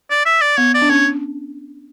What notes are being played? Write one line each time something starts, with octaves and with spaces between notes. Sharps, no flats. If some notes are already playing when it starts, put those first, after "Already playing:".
D5
E5
D5
B3 C#5
D5
D4
C#4 C#5